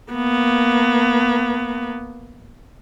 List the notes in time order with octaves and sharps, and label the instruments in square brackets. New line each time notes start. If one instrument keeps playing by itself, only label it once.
[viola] A#3 B3